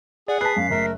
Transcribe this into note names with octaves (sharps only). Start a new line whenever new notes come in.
G#4 D5 F#5
B4 A5 F#6 B6 C7
F#2 F5
F#1 A3 A#4